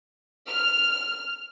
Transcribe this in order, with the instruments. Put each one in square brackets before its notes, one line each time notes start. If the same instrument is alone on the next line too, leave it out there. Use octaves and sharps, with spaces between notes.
[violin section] F6